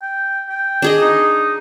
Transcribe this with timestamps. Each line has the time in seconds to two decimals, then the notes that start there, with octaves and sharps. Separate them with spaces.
0.02 G5
0.49 G5
0.82 D4 G#4 D#5
1.01 D#4